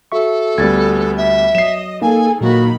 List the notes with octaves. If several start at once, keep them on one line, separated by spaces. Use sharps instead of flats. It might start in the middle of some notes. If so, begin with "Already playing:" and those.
F#4 A4 E5 C#6
D2 G3 B3 G#6 A6
E5
F#3 D#5 C7 E7
A#3 D#4 G#4 A4 G#5
A#2 D#3 F#3 A#3 F#4 B5